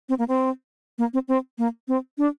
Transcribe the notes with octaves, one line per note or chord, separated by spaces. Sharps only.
C4
A#3
C4
A#3
C4
C4
A#3
C4
D4